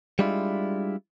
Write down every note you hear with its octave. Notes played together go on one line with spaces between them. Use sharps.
G3 G#3 D4 E4 F4